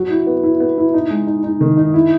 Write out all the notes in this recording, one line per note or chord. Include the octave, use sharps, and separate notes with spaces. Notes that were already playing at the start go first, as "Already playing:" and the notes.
Already playing: F#3
E4
B3
E4
B3
E4
D#4
G#3
D#4
D#4
D#3
D#4
E4